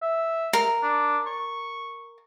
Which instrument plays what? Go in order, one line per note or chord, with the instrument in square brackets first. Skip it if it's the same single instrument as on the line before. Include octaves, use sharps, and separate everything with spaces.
[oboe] E5
[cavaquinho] A#4
[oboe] D4
C#6